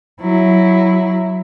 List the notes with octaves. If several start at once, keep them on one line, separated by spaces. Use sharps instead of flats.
F#3 E4